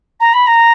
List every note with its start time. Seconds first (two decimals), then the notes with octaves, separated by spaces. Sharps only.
0.20 A#5
0.33 B5
0.46 A#5